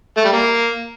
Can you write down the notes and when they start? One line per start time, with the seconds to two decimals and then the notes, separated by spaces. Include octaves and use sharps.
0.17 A3
0.25 G3
0.33 A#3